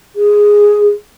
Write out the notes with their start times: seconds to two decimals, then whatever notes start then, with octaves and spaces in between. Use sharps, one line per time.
0.16 G#4